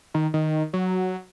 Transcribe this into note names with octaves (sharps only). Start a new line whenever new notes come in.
D#3
D#3
F#3